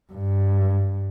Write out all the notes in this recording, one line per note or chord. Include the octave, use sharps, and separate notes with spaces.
G2